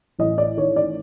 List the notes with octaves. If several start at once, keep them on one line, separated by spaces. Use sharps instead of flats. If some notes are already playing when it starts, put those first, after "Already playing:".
A1 D#5
D5
D#3 C#5
D5